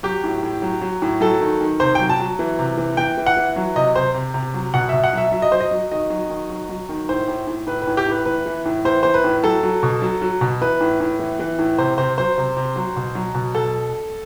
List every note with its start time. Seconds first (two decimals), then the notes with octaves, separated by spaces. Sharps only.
0.03 F#3 G4
0.24 A2
0.43 A2
0.62 F#3
0.81 F#3
1.02 A2
1.21 F#3 A4
1.41 D#3
1.61 D#3
1.80 C3 C5
1.95 F#3 G5
2.10 A5
2.19 F#3
2.39 E3
2.59 C3
2.77 E3
2.97 E3 G5
3.18 E3
3.26 F#5
3.37 E3
3.56 F#3
3.76 C3 D#5
3.95 C3 C5
4.14 C3
4.34 C3
4.54 F#3
4.74 B2 F#5
4.89 B2 E5
5.04 F#5
5.13 F#3 E5
5.32 F#3 E5
5.42 D#5
5.51 F#3 C5
5.60 D#5
5.71 F#3
5.91 D#3 D#5
6.10 F#3
6.30 D#3
6.50 F#3
6.69 F#3
6.89 D#3
7.09 A2 C5
7.28 A2
7.47 A2
7.67 A2 B4
7.82 B4
7.87 A2
7.97 G4
8.06 A2 B4
8.25 E3 B4
8.46 E3
8.65 A2
8.85 E3 C5
9.03 E3 C5
9.14 B4
9.24 A2
9.43 F#3 A4
9.63 F#3
9.83 B2
10.02 F#3
10.22 F#3
10.41 B2
10.61 E3 B4
10.81 A2
11.00 A2
11.19 E3
11.40 E3
11.59 A2
11.78 C3 C5
11.98 C3 C5
12.18 F#3 C5
12.37 C3
12.57 C3
12.76 F#3
12.96 B2
13.15 F#3
13.35 B2
13.55 B2 A4